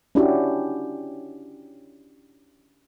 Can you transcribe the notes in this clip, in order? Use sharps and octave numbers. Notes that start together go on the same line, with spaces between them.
C#4 D4 E4 F#4 G4